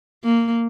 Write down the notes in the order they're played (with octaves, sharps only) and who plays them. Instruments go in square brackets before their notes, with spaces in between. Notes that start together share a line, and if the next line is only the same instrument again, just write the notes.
[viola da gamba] A#3